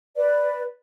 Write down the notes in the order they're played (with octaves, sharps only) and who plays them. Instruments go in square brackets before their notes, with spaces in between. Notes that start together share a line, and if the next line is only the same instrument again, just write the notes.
[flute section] B4 D5